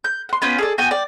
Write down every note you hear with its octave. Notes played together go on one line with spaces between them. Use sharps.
G6
F#5 C6
B3 C#4 F4 G6
G#4 A4 D5
B3 F#4 G5 G#5
D5 G5